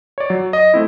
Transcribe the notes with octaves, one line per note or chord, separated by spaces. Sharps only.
C#5 D5
F#3
D#5
A3 C4 E4